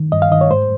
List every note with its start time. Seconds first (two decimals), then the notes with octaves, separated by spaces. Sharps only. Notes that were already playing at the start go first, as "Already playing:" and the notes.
Already playing: D#3
0.12 G2 D#5
0.22 F5
0.32 D#3 D#5
0.41 C#5
0.51 G#2 C5